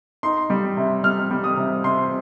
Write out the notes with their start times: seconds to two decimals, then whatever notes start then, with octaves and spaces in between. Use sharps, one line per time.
0.23 D#4 C6
0.50 G3
0.77 C3
1.03 G3 F6
1.31 G3
1.44 D#6
1.57 C3
1.84 C3 C6